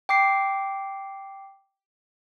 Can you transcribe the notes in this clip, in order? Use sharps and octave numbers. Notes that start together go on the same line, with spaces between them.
G5 D6 C7